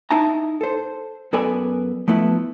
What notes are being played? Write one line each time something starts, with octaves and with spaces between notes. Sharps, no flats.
D#4 E4 E5 A5 A#5
A4 C5
F#2 B3 A4 D5 G#5 B5
F3 A3 B3 E4